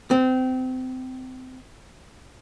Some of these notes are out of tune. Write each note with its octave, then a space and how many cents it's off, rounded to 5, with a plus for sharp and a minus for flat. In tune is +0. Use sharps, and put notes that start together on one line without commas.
C4 -25